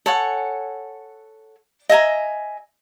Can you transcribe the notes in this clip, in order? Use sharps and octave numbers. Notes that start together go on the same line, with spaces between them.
A4 C#5 F#5 G#5
D#5 E5 G#5 A#5